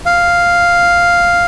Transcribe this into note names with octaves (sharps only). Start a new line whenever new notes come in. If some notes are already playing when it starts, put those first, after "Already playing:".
F5